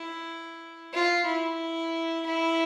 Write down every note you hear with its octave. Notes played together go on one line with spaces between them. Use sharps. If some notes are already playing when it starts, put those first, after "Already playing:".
Already playing: E4
F4
E4
E4